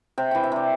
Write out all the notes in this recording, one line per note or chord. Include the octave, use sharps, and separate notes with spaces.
C3 G5
E3 G5
E5
C3 D5